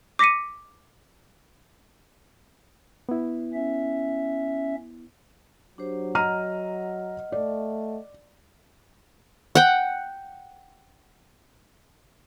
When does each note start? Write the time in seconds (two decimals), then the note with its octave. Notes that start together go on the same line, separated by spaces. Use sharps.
0.19 D6 A#6 B6 C#7 D#7
3.09 B3 E4
3.54 C#4 E5
5.78 F#3 D4 G4 C5
6.15 D#5 F#5 A#5 F6 D#7
7.32 A3 D5
9.55 F#5 G5